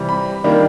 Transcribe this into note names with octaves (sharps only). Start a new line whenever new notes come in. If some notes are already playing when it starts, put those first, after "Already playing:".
Already playing: C3 E3 G3
B5
D#3 G3 A#3 D4